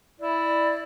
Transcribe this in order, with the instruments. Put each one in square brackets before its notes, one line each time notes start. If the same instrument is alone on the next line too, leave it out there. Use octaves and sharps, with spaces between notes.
[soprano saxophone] E4 [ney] D5